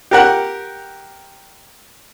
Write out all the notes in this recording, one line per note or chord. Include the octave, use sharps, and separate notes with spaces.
G4 A#4 F#5